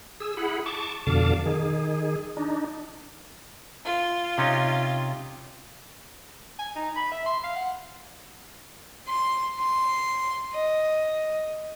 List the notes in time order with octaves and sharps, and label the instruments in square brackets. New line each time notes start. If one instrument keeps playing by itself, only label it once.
[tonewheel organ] G#4 E6
E4 G#4 F#5 B5
A5 C#6 D6
F2 B2 D3 F5 A5 D6
D#3 G#4
D4 D#4
[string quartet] F4
[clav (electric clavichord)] C3 C#4 D#4
[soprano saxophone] G#5
D#4
B5
E5
C6
F5
F#5
[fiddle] C6
C6
D#5